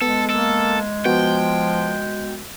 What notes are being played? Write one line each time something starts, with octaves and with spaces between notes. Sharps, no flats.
G#3 B3 A4
A#3 A4
F3 B3 F#4 G5